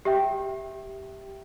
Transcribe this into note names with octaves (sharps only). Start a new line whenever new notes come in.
G4 E5 G5